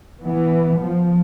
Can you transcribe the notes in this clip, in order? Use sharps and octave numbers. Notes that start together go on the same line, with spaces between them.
E3 B3
F3